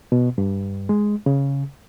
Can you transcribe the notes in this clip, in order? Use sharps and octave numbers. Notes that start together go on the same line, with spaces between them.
B2
G2
G#3
C#3